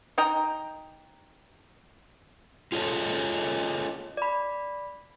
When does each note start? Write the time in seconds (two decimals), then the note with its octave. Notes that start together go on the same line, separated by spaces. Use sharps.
0.18 D#4 G5 A#5
2.72 F4 G#4 A4 C#5 D#5
4.17 D5 B5